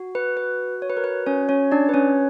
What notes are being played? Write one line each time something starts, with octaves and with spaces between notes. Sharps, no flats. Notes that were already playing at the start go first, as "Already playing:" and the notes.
Already playing: F#4
B4
B4
C#5
B4
A#4
B4
C#4 C#5
C#4 C#5
D4 D5
B4
C#4 C#5